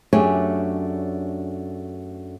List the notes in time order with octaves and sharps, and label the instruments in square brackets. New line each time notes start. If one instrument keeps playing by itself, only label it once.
[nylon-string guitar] F#2 A3 D4 G4 G#4 C#5